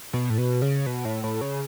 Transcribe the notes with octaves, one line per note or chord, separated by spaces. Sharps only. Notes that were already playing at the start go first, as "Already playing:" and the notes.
B2
A2
B2
C#3
B2
A2
A2
C#3